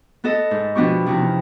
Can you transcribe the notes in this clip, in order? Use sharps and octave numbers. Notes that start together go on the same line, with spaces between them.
B3 A4 D#5
G#2
B2 F3 B3 D4 G4 C#6
E2 C3 F3 C#4 D#4 E4